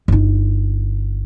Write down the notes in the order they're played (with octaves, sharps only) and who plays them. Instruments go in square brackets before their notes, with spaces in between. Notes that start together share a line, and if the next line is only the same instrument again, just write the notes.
[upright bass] G1 D#4